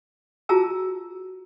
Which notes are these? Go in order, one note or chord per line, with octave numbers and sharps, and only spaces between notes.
F4 F#4 G#4 A5 A#5 E6